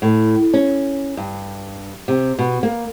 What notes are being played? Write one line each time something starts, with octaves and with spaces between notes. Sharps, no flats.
A2
C#4
G2
C3
B2
A#3